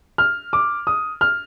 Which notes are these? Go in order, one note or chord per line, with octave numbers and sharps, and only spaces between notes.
F6
D6
D#6
F6